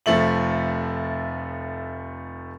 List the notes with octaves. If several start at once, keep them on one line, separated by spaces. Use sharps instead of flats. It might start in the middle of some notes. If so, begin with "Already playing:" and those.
F1 F3 A3 E5 F#7